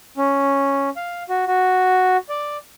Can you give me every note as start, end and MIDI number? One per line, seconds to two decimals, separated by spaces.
0.17 0.90 61
0.96 1.23 77
1.29 1.45 66
1.47 2.17 66
2.29 2.57 74